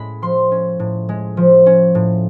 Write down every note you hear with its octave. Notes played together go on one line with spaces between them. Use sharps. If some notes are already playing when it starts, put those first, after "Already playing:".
Already playing: A2 G#3 C#4 B5
F3 C6
C#4
A2
G#3
F3
C#4
A2